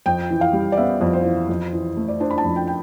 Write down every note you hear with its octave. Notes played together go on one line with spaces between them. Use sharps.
F2 G5
E3
F5
G3
D5
B3 E5
F2
C5
E3
F2
E3
A3
D5
D4 C5
B5
A5
F2
G5
G5